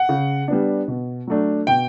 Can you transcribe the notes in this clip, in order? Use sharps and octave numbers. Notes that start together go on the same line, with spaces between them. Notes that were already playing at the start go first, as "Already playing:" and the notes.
Already playing: F#5
C#3
G3 B3 D4
B2
F#3 A3 D4
B2 G5